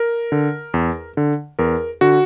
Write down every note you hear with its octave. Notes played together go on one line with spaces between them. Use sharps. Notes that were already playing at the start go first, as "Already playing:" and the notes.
Already playing: A#4
D3
E2
D3
E2 A#4
D3 F#4